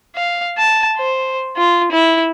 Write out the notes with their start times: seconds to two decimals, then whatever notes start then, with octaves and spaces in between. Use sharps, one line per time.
0.16 F5
0.58 A5
0.98 C5
1.57 F4
1.92 E4